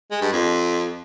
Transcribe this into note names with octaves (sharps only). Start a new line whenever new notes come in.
G#3
G2
F2